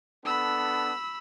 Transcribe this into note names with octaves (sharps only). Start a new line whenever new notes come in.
B3 D4 A4 B5 E6